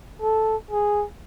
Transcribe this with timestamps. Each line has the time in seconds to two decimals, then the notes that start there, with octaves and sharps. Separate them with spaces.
0.22 A4
0.71 G#4